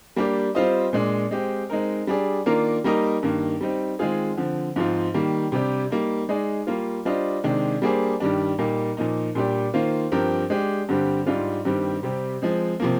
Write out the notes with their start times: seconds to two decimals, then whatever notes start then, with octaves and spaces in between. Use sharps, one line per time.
0.16 G3 A#3 D4 G4
0.55 G3 C4 F4 C5 D#5
0.93 A#2 G#3 D4
1.31 G#3 C4 G4
1.70 G#3 C4 D#4 A#4
2.07 G3 D4 G#4
2.46 D#3 A#3 D4 F4 A#4
2.84 G3 A#3 D#4 A#4 D#5
3.23 G2 D#3 A#3
3.61 G3 C4 D#4
3.99 D#3 G#3 C4 F4 G#4
4.37 D3 F3 C4
4.76 G#2 F3 C4 F4
5.14 D#3 G3 A#3
5.52 C3 G3 D4 G4
5.90 G3 A#3 D#4
6.29 G#3 D#4 G#4 D5
6.67 G3 A#3 F4
7.05 G3 D4 F4 C5 D#5
7.44 C3 D#3 G#3 D4
7.82 G3 A#3 D4 G#4 C5
8.20 G2 D#3 G3 D4
8.58 A#2 G3 A#3 D#4
8.97 A#2 F3 A#3 D#4
9.35 A#2 G3 D4 G4
9.74 D#3 A#3 F4 C5
10.12 G2 F3 C4 G4 A#4
10.50 G#3 D4 G4
10.88 G2 D3 G3 C4 G4
11.26 G#2 G3 D4 F4
11.65 G2 D#3 G3 C4 G4
12.03 C3 G3 C4 G4
12.42 F3 G#3 C4
12.80 C3 F3 A#3